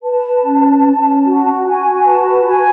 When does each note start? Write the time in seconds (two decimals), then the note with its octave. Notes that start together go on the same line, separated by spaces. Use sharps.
0.03 B4 A5
0.44 C#4
0.84 C#4
1.24 F#4
1.65 F#4 G#5
2.05 B4 A5
2.45 F#4 G#5